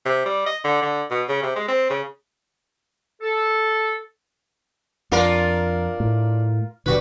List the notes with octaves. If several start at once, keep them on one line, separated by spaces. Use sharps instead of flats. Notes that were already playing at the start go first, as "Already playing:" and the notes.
C3
G3
D#5
D3
D3
B2
C#3
C3
G#3
C4
C#3
A4
F2 D4 F4 A#4
A2
E1 B2 D3 G3 F#4 B4